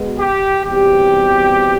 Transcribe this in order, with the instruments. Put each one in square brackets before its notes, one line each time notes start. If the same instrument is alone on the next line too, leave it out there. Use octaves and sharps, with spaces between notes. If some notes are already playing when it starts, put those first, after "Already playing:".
Already playing: [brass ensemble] B2 G#3 B3
G4
E2 B2 G3 C4 G4